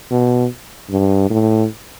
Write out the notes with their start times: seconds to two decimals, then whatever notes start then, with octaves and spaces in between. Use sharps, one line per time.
0.11 B2
0.90 G2
1.30 A2